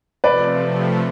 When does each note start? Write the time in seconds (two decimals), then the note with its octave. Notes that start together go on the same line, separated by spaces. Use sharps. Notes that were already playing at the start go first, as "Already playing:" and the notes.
0.24 C3 F3 A3 B4 D5
0.62 C3 F3 A3